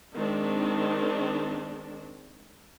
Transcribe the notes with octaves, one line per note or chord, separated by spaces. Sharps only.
D#3 G#3 C4 D4